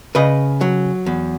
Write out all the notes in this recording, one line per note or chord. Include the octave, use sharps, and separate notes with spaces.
C#3 B4 D#5
F#3
E2